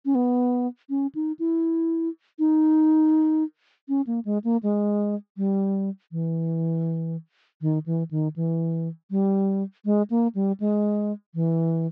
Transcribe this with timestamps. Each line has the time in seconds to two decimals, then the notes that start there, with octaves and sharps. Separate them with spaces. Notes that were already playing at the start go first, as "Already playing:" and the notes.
0.05 C#4
0.15 B3
0.90 C#4
1.15 D#4
1.39 E4
2.39 D#4
3.88 C#4
4.07 A#3
4.25 G#3
4.44 A#3
4.63 G#3
5.37 G3
6.12 E3
7.61 D#3
7.86 E3
8.11 D#3
8.36 E3
9.11 G3
9.85 G#3
10.10 A#3
10.35 G3
10.60 G#3
11.35 E3